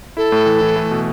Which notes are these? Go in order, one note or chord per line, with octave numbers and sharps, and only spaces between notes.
E4 A4
A2
E3
E3
A3
B2